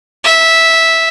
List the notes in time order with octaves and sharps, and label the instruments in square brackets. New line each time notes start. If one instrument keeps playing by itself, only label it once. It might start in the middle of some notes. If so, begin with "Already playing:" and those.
[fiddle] E5